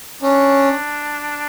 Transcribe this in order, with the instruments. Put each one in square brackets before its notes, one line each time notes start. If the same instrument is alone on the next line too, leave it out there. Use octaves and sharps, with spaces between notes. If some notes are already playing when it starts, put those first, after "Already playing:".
[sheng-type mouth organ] C#4 [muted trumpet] D4